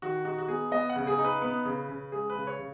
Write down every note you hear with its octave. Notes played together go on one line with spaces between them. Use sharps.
D#3 F#4
D#4 F#4
F#4
B3 G#4
B3 D#5
F#5
C#3
G#4
D#4
B4
B3 B4
C#3
C#3
G#3 G#4
B4
C#3
C#5
C#3